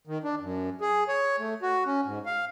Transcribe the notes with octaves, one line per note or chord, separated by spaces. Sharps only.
D#3
D4
F#2
G#4
C#5
A3
F#4
C#4
G#2
F5